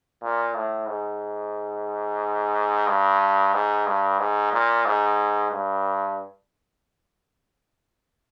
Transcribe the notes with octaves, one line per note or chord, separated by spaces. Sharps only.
A#2
A2
G#2
G2
G#2
G2
G#2
A#2
G#2
G2